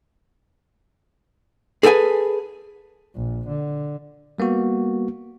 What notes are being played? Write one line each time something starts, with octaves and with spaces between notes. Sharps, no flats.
G#4 A4 B4 G5 G#5
A#1
D3
G3 A#3 B3 F#4